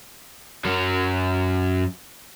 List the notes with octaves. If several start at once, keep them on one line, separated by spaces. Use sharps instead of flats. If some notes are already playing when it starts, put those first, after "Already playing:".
F#2 F#3